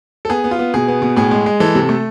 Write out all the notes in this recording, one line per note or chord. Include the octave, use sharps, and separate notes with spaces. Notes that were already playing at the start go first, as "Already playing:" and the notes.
A4
B3 G#4
B3
F4
B3
B2 G#4
B3
B2
A2 G#4
G#3
G#3
E3 A4
C3
A3